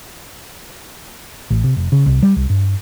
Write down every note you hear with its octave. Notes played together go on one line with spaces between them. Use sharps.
A1
C3
F1
C#3
C2
G3
C2
G2